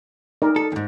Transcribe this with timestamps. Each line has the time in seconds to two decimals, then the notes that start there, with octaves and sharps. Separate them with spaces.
0.42 D#4 A#4 D5
0.56 A4
0.72 E2 G#2